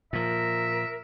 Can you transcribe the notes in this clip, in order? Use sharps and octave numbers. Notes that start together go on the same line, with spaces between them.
A#2 F3 A#4 E5